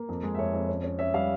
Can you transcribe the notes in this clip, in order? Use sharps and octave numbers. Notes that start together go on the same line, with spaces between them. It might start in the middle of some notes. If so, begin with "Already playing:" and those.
Already playing: A#3
F2
G#3
E5
F2 C#5
F2
C#4
C#4
C#4 E5
G3 F5